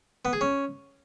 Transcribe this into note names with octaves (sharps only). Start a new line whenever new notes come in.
B3
G#4
C#4